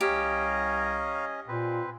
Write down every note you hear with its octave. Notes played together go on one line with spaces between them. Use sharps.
C2 C#4 G4 C#5 D#5 F5 G#5 A#5
A#2 C4 B4